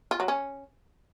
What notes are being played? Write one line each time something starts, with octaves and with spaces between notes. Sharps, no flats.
F4
F#3
C#4